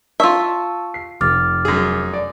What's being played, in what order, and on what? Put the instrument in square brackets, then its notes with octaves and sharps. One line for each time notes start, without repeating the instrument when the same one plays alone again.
[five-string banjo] F4 E5 [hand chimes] A5 C#6 E6
[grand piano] C7
[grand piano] F1 [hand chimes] D6 F6 A6
[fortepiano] F#2 G#4
D5